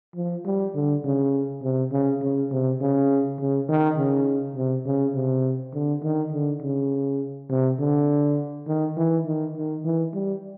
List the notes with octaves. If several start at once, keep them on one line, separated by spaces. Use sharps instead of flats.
F3
G3
D3
C#3
C3
C#3
C#3
C3
C#3
C#3
D#3
C#3
C3
C#3
C3
D3
D#3
D3
C#3
C3
D3
D#3
E3
D#3
D#3
E3
G3